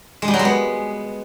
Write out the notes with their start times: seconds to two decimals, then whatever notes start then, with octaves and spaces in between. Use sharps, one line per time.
0.22 G#3
0.28 G3
0.34 F#3
0.39 G#3
0.45 B3